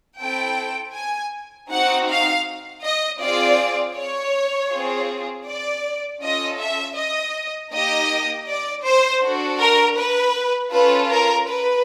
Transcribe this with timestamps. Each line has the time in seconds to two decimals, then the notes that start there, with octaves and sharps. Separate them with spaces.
0.20 C4 E4 A4 G5
0.94 G#5
1.71 C4 D#4 F#4 F#5
2.09 F5
2.83 D#5
3.21 C4 F4 G#4 D5
3.96 C#5
4.72 C4 F4 G#4
5.47 D5
6.22 C#4 F4 A4 D#5
6.60 E5
6.97 D#5
7.73 A#3 D#4 G4 D#5
8.47 D5
8.85 C5
9.23 D4 F#4 A4
9.60 A#4
9.98 B4
10.73 C#4 F4 A4 B4
11.11 A#4
11.48 B4